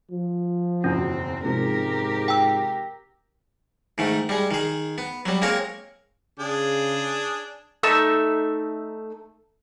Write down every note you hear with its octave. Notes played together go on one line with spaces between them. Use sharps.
F3
F#1 E2 B2 C4 C#4
G#2 C3 F3 G#3 G4 A#4
G5 E6
G#2 D#3 A3
G3 G#3
D#3 G#4
B3
F#3 G3
G#3 A#3 C4 A#4 C#5
C#3 D4 G#4
A3 D#4 E5 E6